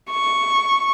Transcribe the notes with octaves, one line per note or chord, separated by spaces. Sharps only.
C#6